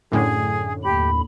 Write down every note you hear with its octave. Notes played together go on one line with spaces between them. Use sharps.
F#2 A2 D3 G#4
D#2 G4 B5